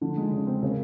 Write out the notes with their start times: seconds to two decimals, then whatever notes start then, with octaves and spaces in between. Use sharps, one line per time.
0.01 D3 F3
0.17 G#3
0.31 C#3
0.47 C4
0.62 C#3 A#3